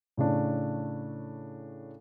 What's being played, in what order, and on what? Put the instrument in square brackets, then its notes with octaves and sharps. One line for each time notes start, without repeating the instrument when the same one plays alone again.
[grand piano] A2 C#3 A3 D4